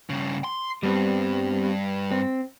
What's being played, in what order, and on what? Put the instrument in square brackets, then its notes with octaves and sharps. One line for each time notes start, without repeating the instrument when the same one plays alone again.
[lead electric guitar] G2 C#3
C6
[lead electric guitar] G2 [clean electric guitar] G3 B3 C4
[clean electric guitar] C4